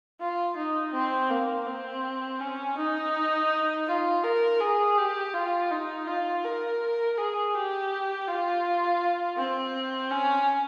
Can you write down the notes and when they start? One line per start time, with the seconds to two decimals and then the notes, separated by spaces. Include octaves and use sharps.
0.20 F4
0.56 D#4
0.93 C4
1.30 A#3
1.67 C4
2.40 C#4
2.77 D#4
3.87 F4
4.24 A#4
4.60 G#4
4.97 G4
5.33 F4
5.71 D#4
6.07 F4
6.44 A#4
7.17 G#4
7.54 G4
8.27 F4
9.38 C4
10.11 C#4